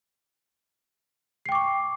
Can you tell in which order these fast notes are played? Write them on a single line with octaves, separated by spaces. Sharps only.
C7 G5 D6 C#6